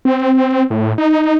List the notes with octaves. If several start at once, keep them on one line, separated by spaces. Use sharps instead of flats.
C4
A2
D#4